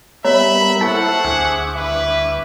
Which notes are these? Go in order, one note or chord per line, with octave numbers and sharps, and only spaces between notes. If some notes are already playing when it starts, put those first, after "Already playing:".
G3 A#3 B3 C#5 D#5 E5 A#5 B5
E4 A4 C5 E5 F#5 A5 C#6
D2 G#4 G#5 C#6 D6 F#6
G3 E4 B4 E5